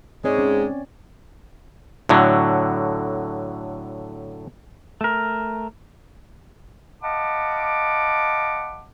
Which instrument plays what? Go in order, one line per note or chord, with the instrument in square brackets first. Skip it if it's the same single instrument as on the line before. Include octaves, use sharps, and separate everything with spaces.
[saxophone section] G#2 G#3 [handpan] C4 C#5 D5
[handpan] C#4
[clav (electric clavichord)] A2 D3 F#3
[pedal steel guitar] A3 A#4
[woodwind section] D#5 F5 F#5 A5 B5 D6